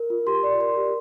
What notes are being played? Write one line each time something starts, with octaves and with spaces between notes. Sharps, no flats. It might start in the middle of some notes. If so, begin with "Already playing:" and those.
Already playing: A#4
F4
G4 C6
D5
A#4 C6
G4